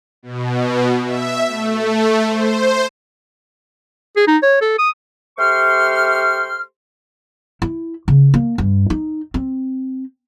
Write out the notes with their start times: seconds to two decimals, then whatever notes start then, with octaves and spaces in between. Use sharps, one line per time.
0.23 B2
1.04 E5
1.48 A3
2.26 C5
4.16 G#4
4.28 D#4
4.43 C#5
4.62 A4
4.79 D#6
5.38 A3 G4 C5 C6 C#6 F6
7.62 E4
8.08 C#3
8.34 A#3
8.58 G2
8.90 D#4
9.34 C4